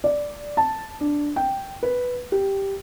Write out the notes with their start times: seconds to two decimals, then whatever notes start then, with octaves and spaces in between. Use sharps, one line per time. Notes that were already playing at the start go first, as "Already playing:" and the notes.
0.04 D5
0.57 A5
1.01 D4
1.36 G5
1.83 B4
2.32 G4